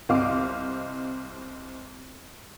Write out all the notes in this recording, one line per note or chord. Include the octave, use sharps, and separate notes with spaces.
C2 C4 D#5 F5 D6